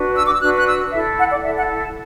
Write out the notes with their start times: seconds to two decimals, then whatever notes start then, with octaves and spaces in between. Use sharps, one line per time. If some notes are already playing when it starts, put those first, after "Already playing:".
Already playing: D4 F#4 B4
0.15 E6
0.26 D6
0.33 E6
0.41 D4 F#4 B4 F#6
0.57 F#6
0.67 E6
0.93 E4 A4 E5
1.19 F#5
1.32 D5
1.44 E4 A4 E5
1.57 F#5
1.84 A5